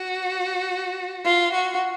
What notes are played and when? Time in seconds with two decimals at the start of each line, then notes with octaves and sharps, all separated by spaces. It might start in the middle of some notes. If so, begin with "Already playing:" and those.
Already playing: F#4
1.24 F4
1.52 F#4